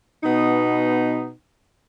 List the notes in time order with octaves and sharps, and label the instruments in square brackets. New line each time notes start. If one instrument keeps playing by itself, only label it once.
[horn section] B2 B3 D#4